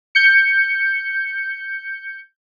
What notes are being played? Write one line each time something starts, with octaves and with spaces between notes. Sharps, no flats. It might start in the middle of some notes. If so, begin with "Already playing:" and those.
G6 C#7